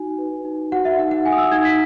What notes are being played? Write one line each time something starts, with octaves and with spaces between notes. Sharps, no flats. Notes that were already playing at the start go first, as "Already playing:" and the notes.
Already playing: D#4 F#4 G#5
B4
D#4
F#4 F#5
E5
D#4 F#5
F#5
D#4 G#5
D#6
E6
D#4 G#6
B6